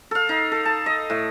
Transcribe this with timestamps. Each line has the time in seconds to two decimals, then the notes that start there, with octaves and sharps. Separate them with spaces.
0.11 A4 F5
0.29 D#4
0.52 A4
0.65 A5
0.86 D#5
1.10 A2